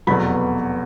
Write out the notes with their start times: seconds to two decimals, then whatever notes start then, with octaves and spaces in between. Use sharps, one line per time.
0.07 F1 E2 B2 F#3 B5